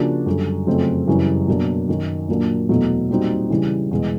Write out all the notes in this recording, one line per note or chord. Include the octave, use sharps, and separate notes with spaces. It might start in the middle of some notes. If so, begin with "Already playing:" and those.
Already playing: C#3 F3 A#3 D4 F#4
F#2 D3 G3
F2 C#3 F#3 A3 C4
F#2 C#3 E3 G3
B2 F#3 A#3 D4
F#2 D#3 F#3
A#2 F#3 A#3 D4
E2 B2 F#3 A3
A#2 G3 C4 D#4 F#4
C#3 E3 G3
E2 B2 G#3